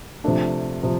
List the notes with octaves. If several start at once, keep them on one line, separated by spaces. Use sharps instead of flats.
C3 F3 A3 D4
C3 F3